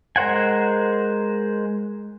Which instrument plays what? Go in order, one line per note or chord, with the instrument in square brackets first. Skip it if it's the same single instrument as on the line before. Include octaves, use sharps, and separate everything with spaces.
[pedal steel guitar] G#3 A#4 C5 F#5 G#5